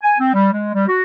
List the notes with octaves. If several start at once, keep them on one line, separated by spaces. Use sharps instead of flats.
G#5
C4
G3
G#3
G3
F#4